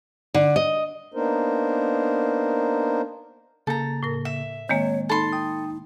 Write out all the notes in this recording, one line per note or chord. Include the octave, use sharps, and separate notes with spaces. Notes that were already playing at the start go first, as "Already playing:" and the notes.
D3
D#5
A#3 B3 D4 D#4 A#4 C5
C#3 A#3 A4 A#5
A2 A#4
E5
D#3 G#3 A#3 C4 C#5
D#4 A4 B5 C6
G5 D#6